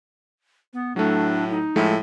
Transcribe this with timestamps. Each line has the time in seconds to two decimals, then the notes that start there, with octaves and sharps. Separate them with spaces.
0.73 B3
0.96 A2 F#3 A3 D4
1.50 D#4
1.76 A2 F3 G#3 A3